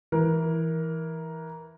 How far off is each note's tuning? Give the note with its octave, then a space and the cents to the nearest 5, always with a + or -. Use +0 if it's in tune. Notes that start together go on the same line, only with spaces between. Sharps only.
E3 -5 A#4 +10